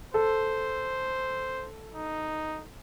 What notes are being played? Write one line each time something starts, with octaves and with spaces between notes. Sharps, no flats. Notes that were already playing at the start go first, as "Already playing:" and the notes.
A4 C5
D#4